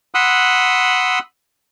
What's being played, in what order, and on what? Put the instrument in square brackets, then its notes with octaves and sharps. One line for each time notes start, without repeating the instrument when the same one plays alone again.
[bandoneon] F#5 B5 C6 D#6 E6 F#6